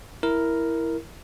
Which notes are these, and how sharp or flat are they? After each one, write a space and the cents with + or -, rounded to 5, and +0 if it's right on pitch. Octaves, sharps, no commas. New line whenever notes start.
E4 +0 A#4 +0